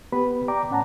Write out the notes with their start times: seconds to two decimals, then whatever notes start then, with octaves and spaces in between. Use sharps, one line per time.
0.12 B3 G4 B4 B5
0.48 D5 G5 A#5 D6
0.70 A2 C#4 F#5 A5 A#5